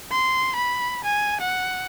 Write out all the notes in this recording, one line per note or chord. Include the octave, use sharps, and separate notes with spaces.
C6
B5
G#5
F#5